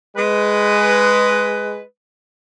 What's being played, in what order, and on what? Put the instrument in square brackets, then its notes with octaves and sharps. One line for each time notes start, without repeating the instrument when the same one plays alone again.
[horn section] G#3 B4